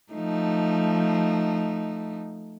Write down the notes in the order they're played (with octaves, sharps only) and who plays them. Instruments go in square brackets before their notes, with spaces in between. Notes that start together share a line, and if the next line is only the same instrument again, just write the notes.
[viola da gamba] F3 A3 D#4